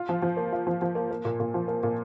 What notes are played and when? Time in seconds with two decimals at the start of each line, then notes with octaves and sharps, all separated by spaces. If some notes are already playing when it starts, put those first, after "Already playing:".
Already playing: F4
0.09 F3
0.22 F3
0.37 A#3
0.53 F4
0.67 F3
0.82 F3
0.95 A#3
1.11 A#3
1.25 A#2
1.40 A#2
1.54 F3
1.68 A#3
1.83 A#2